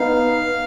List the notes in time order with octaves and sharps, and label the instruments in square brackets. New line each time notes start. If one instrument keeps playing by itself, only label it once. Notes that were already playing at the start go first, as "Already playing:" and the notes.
Already playing: [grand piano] B3 D#4 [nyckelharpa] F5